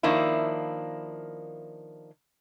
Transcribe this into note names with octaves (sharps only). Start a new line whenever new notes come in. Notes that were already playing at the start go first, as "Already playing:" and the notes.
D#3 F3 A#3 D4 E4